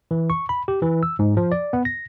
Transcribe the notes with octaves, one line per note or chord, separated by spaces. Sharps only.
E3
C#6
B5
G4
E3
E6
G#2
F3
D5
B3
A#6